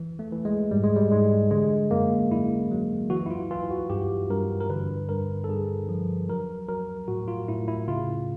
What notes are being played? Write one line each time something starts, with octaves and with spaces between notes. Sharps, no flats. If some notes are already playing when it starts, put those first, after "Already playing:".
Already playing: E3
A3
E3
G#3
G#2 G3
G#3
G3
G#2 G#3
D3 G#3
F#2 A#3
F#2 E4
F#3
E3 F#4
E4
F4
E3 F4
F#4
G2 G4
G2 A#4
A#4
D3 B4
G2 A#4
A4
G2 G#4
F3
F#3 A#4
F#3 A#4
A2 F#4
F4
A2 E4
E4
C#3 F4